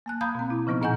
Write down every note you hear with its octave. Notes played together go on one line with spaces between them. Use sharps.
A#3 A5 F#6
F5 A#5 B5 D#6 G6 G#6
B2 C4
E4
C#3 F3 B3 D#4 F6
A#2 D#4 D#5 F#5 G#5 G6